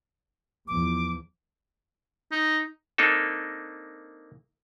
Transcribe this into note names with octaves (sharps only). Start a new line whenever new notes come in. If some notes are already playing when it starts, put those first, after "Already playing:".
E2 F3 D6
D#4
A#3 C4 D4 D#4 A4